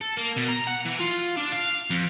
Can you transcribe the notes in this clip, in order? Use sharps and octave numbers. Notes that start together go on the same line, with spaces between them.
A4
A#3
B2
A#5
F#5
E3
F4
D4
F5
F2